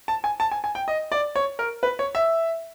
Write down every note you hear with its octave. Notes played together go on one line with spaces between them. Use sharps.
A5
G#5
A5
G#5
G#5
G5
D#5
D5
C#5
A#4
B4
C#5
E5